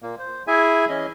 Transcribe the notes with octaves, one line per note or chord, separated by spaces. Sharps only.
A#2 A#3
C5
E4 G#4 E5 G#5
E3 C#4 D#5